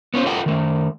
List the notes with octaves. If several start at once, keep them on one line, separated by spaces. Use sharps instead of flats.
B3 C#4 F4 C5
F4 A4 B4 D#5 F#5 G5
D#3 A3